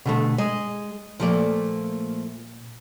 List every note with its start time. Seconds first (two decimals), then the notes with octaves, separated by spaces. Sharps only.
0.06 B2 D3 A3
0.38 G#3 D#5
1.20 A#2 F3 A3 A#3 D5